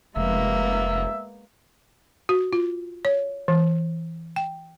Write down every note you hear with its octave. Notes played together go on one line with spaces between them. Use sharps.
F1 G#3 A#3 B3 E5
F#4
F4
C#5
E3
G5